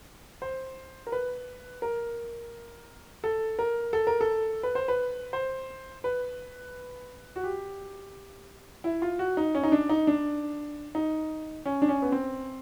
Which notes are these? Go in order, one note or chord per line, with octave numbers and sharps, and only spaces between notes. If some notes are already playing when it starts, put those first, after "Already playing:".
C5
A#4
B4
A#4
A4
A#4
A4
A#4
A4
B4
C5
B4
C5
B4
F#4
G4
E4
F4
F#4
D#4
C#4
D#4
D4
D#4
D4
D#4
C#4
D4
C#4
B3
C4